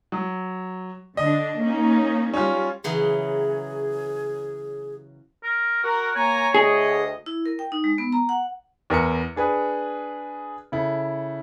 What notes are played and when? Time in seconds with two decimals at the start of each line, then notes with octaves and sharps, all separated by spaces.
0.12 F#3
1.17 D3 D4 D#5
1.60 A#3 C#4 D#4
2.33 G3 C#4 F4
2.84 C#3 E3 F#3 G#4
5.43 A#4
5.84 F#4 A#4
6.15 A#3 C#5 G#5 A#5
6.54 D2 G#4 D#5
7.26 E4
7.46 A#4
7.59 G5
7.72 D#4
7.84 G#3
7.98 B3
8.12 A#5
8.29 F#5
8.90 E2 A#4 B4 C#7
9.36 D4 G#4 B4
10.72 C#3 E4 A4